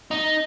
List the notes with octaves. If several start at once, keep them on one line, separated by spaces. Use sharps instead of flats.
D#4